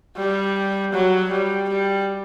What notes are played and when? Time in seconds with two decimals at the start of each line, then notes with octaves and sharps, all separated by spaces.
0.16 G3
0.92 F#3
1.30 G3
1.69 G3